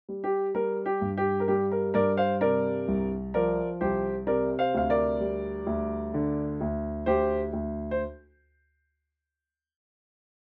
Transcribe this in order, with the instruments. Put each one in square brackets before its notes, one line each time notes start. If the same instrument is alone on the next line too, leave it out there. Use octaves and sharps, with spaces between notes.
[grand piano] G3
G4
G3 A#4
G4
G2
G4
A#4
G3 G4
A#4
G2 A#4 D5
C5 F5
C3 A#4 D5
C2
F3 A#4 D5
C2 G4 C5
C3 A#4 D5
C5 F5
D2 F5
A#4 D5
G3
D2
D3
D2
D2 G4 C5
D2
C5